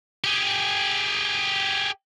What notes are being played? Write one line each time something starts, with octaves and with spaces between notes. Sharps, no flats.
G4 G#4